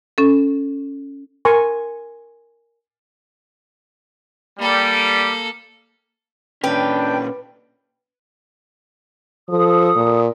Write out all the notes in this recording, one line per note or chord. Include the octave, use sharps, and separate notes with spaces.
C#4 A4
A#4 G#5 C6 C#6
G3 A#3 A4
A#2 C#4 D4 B4 G5
F3 A4 D#6
A#2